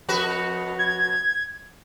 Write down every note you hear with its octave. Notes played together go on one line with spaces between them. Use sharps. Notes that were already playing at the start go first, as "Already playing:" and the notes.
F2 F#4 B4
G#6